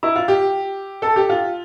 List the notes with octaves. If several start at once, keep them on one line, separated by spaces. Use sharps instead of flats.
E4
F4
G4
A4
G4
F4